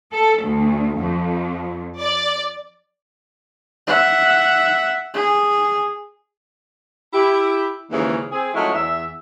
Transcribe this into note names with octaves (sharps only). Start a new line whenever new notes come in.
A4
D2
F2
D5
E5 F#5
G#4
E4 G4
D#2 G#2 C#3 E3 G#3 C#4
C4 G#4
F3 F#3 G#3 A3 C#4 E4
E2 E5